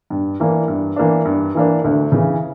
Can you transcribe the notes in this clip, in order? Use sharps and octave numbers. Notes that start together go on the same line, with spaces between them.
G2
E3 A#3 D4
G2
E3 A#3 D4
G2
E3 A#3 D4
D2
C#3 E3